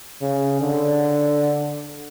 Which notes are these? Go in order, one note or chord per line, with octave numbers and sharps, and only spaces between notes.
C#3
D3